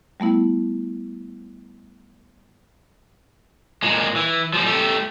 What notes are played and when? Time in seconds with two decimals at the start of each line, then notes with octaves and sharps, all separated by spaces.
0.20 G3 A3 B3 E4
3.82 A#2 G#3
4.16 E3
4.53 F3 G3
4.66 A3 G4